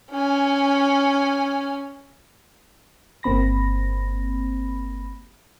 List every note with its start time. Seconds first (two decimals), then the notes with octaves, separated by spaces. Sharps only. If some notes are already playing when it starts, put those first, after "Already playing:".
0.11 C#4 G#5
3.23 G1 A#3 C4 B5 A#6